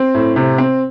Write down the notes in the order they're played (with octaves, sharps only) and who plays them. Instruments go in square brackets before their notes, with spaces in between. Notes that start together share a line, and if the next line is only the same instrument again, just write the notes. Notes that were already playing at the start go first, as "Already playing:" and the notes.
Already playing: [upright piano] C4
A2
C3
C4